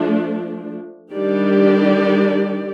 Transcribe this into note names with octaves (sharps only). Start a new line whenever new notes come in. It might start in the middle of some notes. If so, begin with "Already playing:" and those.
Already playing: F3 A3 D4
D#3 G3 D4 G4 D5